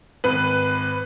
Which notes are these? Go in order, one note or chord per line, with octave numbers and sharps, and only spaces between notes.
G#1 B4